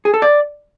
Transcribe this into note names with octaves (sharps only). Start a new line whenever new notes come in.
G#4
A4
D5